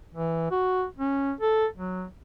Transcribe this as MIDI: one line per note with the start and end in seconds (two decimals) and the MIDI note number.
0.14 0.50 52
0.51 0.85 66
0.98 1.32 61
1.41 1.66 69
1.77 2.05 54